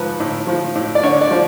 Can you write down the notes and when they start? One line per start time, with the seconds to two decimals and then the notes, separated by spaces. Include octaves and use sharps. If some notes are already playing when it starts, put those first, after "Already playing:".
Already playing: G#2 F3 B4
0.20 A2
0.47 F3
0.75 A2
0.95 D5
1.03 D3 C#5
1.21 D5
1.31 F3